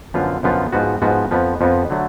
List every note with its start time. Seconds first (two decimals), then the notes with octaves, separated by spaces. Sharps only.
0.14 F#2 D3 F3 B3 F4
0.43 F#2 D3 F3 B3 F4
0.72 G#2 F3 B3 F#4
1.02 G#2 F3 B3 F#4
1.31 F2 F3 B3
1.61 F2 F3 B3
1.90 D3 F#3 A3